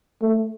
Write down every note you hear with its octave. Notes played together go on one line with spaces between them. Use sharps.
A3